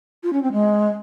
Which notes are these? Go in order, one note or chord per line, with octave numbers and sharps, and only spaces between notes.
F4
C#4
C4
G#3